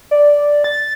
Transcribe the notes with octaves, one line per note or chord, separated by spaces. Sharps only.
D5
A6